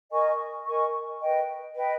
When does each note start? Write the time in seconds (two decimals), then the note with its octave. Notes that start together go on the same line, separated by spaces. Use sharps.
0.11 A#4 D#5 G#5 C#6
0.65 A#4 D#5 G#5 C#6
1.20 B4 D#5 G5
1.74 B4 D#5 G5